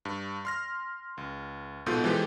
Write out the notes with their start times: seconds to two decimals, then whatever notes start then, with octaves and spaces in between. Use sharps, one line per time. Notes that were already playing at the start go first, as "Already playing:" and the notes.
0.05 G2
0.45 C6 F6 A#6
1.18 C#2
1.86 A#1 G#2 B2 F4 A4 G6
2.04 E3 F3 G#3 G4 A4 B4